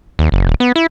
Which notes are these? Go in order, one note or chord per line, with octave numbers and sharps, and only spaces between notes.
D#2
F#1
D#1
B3
E4